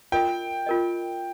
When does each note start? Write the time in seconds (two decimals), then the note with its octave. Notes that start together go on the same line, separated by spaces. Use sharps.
0.12 F4 A#4 D#5 G5
0.67 F4 A#4 D#5